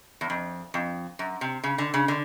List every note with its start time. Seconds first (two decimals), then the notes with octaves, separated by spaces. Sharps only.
0.21 E2
0.30 F2
0.74 F2
1.19 F#2
1.41 C3
1.64 C#3
1.78 D3
1.94 C#3
2.08 D3